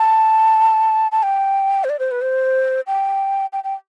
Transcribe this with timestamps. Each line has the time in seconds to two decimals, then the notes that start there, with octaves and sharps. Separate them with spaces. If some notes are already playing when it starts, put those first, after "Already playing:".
Already playing: A5
1.12 A5
1.23 G5
1.84 C5
1.89 D5
1.99 C5
2.11 B4
2.22 C5
2.87 G5
3.53 G5
3.64 G5